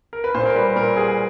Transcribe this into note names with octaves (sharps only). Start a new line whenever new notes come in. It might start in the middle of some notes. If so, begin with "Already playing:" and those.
A#4
B4
A#2 C5
A#4
G3 B4
A#2 A#4
G3 G#4